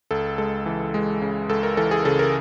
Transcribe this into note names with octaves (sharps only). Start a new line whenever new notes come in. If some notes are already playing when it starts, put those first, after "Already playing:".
C#2 A4
G#3 A4
E3
G#3
C#3
C#2 A4
A#4
E3 A4
G#4
C#3 A4
A#4